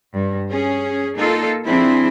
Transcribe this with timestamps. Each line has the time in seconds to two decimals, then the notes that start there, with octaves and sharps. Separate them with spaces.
0.13 G2
0.52 C#4 G#4
1.18 A#3 D#4 F4 A4
1.65 F3 C4 D4 E4 G#4